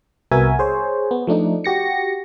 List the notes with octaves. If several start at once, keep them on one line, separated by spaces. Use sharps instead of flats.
C2 B3 F#4 A#4 E5 G#5
G#4 C5 C#5
B3
F3 A3 D4 D#4
F#4 G4 A#6 C#7